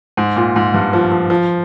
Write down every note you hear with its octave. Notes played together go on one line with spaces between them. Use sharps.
G#2
A#2
G#2
G2
F3
F3
F3